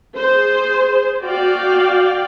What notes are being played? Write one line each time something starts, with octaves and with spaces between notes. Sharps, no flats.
G#4 C5
F#4 D5 F5 G5